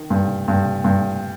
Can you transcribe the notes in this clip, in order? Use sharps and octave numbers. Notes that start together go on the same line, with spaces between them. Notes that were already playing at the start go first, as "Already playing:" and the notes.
Already playing: D#3
G2
G2
G2